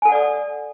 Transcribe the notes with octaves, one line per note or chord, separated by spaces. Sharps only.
A4 D5 F#5 G#5 D#6